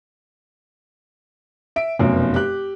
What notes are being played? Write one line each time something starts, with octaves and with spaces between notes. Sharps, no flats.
E5 D7
F1 F#2 B2
G4 F#6